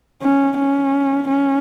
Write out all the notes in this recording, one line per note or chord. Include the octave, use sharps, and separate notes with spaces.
C#4
C#4
C#4